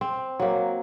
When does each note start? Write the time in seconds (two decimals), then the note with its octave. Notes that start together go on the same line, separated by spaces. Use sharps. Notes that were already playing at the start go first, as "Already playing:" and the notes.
0.01 C4
0.40 F#3 A#3